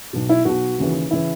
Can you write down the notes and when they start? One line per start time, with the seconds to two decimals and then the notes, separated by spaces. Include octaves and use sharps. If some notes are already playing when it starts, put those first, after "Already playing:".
0.13 B1 B2
0.29 E4
0.45 B1 B2 F#4
0.78 D#2 C#3 E3
1.11 C#3 E3 E4